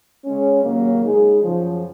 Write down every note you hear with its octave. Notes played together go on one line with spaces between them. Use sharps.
C#3 G#3 C#4
D#2 C#3 F#3 A#3
C#3 G#3 D#4 G#4
F#2 C#3 F3